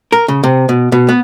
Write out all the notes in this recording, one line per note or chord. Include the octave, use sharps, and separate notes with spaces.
A#4
C#3
C3
B2
B2
B3